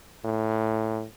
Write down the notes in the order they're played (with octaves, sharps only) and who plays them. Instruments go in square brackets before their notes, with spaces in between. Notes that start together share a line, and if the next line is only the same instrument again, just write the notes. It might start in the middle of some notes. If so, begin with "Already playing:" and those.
[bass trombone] A2